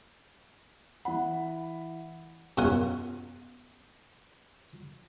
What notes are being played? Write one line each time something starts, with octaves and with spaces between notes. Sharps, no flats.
E3 F#5 B5
F#2 B2 F4 F#5 G#5